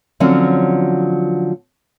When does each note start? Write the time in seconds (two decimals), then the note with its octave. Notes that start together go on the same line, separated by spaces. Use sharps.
0.20 D3 F3 F#3 C4 C#4